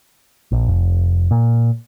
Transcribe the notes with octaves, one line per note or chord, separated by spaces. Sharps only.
A#1
F1
A#2